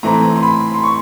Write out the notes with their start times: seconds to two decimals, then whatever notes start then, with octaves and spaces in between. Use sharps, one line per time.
0.03 A2 E3 A3 C4 A#5
0.36 C6
0.43 B5
0.74 C6
0.83 C#6